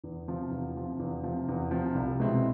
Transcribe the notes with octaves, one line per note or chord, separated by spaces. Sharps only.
E2
C3 F3
E2
C3 F3
E2
C3 F3
E2
C3 F3
C2
B2 G#3 C4 E4